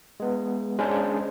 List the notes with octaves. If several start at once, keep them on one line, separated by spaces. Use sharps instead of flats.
G#3 B3
G#3 C#4 D4 C5